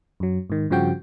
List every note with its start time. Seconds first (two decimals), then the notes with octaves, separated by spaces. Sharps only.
0.20 F#2 F#3
0.50 G#2 D#3
0.70 G2 C#3 F3 F#4 G5